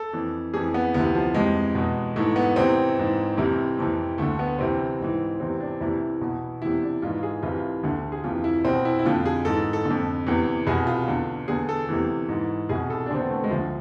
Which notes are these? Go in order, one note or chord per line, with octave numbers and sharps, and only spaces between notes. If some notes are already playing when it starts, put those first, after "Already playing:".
Already playing: A4
F2 E3
F2 E3 G#4
B3
D2 C3 E3 B3
F3
F2 C3 E3 G#3
E2 B2
G#2 E3 A3
B3
E2 C3 E3 C4
G#2 E3
C2 C3 E3
F2 C3 E3
D2 D3 A3
B3
C2 C3 E3 C4
G#2 E3
E2 C3 E3 C4
D4
C2 C3 E3 E4
E2 B2
E2 C3 E3 E4
D4
G#2 E3 F4
G#4
C2 C3 E3 F4
D2 D3
G#4
F2 C3 E3 F4
E4
C2 B2 C4
E4
E4
F2 D3 F4
G#4
G#2 E3 A4
A4
F2 D3
E2 C3 E3
C2 B2 G#4
F4
E2 D3
E2 D3 G#4
A4
E2 C3 E3
G#2 E3
C2 B2 G#4
A4
D4
E2 D3 C4
B3
A3
G#3
D2 D3 F3